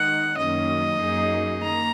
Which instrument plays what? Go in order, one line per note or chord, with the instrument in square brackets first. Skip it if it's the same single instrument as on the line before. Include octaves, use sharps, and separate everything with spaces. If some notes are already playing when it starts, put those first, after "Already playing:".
Already playing: [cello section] D#3 G#3 D#4 [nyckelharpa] F#5
[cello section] F#2 D#3 F#3 A#3 C#4 [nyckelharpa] D#5
[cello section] F#2 F#3 A#3 D#4 G#4
[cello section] D#3 A#3 [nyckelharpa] A#5